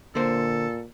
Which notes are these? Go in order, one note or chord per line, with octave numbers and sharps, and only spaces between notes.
A#2 D3 A#3 A4 C5